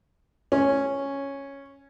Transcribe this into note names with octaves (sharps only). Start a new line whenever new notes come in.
C#4